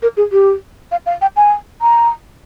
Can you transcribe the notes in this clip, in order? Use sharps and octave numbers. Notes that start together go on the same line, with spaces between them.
A#4
G#4
G4
F5
F5
G5
G#5
A#5